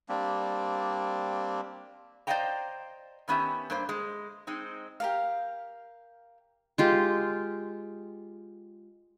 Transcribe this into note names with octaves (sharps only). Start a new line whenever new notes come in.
G3 A#3 C4 D4
C5 D5 D#5 F5 G5 A#5
D#3 B3 C#4 G4 E5
G2 A#3 C5
G#3
G#3 C4 D#4
G4 A#4 F5
G#3 F4 G4